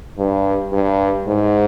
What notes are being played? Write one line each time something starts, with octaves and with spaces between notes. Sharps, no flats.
G2
G2
G#2